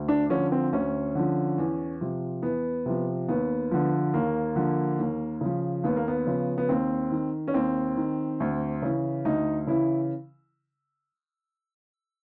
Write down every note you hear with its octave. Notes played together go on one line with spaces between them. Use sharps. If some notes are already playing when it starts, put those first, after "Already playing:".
Already playing: D2
D4
D3 F3 C#4
C4
D2 C#4
D3 F3
E2
C3 F3
E2 B3
C3 F3
D#2 B3
D3 F3
D#2 A#3
D3 F3
D#2
C#3 F3
D#2 B3
A#3
B3
C#3 F3
B3
D#2 C4
D#3
C#4
D#2 C4
D#3
D2
C#3 E3
D2 D#4
C#3 E3 E4